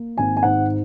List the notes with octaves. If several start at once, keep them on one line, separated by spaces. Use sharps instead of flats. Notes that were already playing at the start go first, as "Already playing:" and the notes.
Already playing: A#3
G#1 G#5
G#5
G#2 F#5